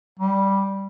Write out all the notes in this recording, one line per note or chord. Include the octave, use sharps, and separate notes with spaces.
G3